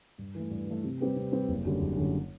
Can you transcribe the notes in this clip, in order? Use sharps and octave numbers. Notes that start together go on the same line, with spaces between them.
G2
E3 A3
G2
E3 A3
C3
G3 C4 G4 B4
C3
G3 C4 G4 B4
F#1
F#2 D3 G3
F#1
F#2 D3 G3